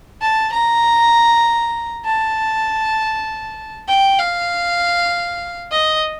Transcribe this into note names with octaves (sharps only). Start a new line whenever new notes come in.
A5
A#5
A5
G5
F5
D#5